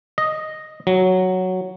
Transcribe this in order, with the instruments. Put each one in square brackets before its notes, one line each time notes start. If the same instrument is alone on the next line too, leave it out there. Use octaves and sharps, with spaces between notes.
[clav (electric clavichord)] D#5
F#3